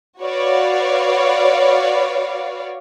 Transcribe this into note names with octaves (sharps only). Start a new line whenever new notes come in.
F#4 B4 C#5 D5 F5